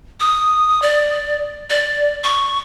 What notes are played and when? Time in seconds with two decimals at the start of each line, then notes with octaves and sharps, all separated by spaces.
0.20 D#6
0.82 D5
1.70 D5
2.24 C#6